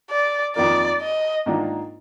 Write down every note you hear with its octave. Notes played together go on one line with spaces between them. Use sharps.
D5
F2 D#3 A#3 F4 A#4 D5
D#5
G#2 D#3 A#3 D4 F4